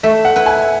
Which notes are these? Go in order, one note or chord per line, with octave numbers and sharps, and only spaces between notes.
A3 E5
F#5
E4 B4
G#5